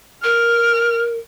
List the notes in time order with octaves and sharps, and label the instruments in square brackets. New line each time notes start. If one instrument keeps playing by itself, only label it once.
[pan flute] A#4 [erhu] F6